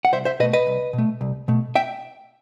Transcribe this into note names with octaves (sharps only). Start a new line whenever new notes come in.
F#5
C2 C5 E5
C5 E5
B2 A3 B4 D#5
B4 D#5
C2
B2
A3
C2
B2 A3
E5 G5